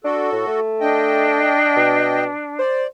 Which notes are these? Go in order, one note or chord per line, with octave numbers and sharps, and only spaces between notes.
D4 F#4 A4
A2
A3
D4 D#5 G5
B2
C5 D5